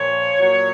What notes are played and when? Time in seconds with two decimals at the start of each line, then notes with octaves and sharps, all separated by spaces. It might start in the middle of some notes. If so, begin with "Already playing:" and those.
Already playing: A#2 F3 C#5
0.39 A#2 F#3